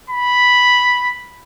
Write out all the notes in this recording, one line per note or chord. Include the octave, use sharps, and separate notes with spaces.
B5